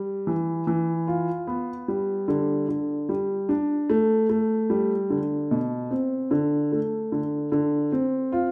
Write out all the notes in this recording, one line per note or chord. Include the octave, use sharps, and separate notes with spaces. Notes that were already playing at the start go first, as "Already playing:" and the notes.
Already playing: G3
E3
E3
F4
B3
G3
D3
D3
G3
D4
A3
A3
G3
D3
B2
C4
D3
A3
D3
D3
C4
F4